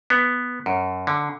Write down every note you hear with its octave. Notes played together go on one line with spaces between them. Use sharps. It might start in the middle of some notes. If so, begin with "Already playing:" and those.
B3
F#2
D3